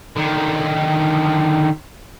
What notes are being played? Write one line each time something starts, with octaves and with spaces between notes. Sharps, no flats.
D3 D#3